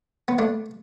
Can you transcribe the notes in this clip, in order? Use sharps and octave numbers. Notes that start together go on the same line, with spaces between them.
B3
A3 D4